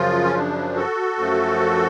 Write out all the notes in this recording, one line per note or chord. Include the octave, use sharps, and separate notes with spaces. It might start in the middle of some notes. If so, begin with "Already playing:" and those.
Already playing: F#2 C#3 F3 F4
C#4
D4
F#4 A4
F#2 F3 A3